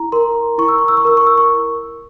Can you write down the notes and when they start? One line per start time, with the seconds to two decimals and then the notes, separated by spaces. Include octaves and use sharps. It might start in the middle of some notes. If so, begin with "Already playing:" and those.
Already playing: E4 A#5
0.12 A#4 C6
0.58 E4 C#6
0.68 E6
0.78 C#6
0.88 E6
0.97 C#6
1.05 A#4 E6
1.17 C#6
1.27 E6
1.38 C#6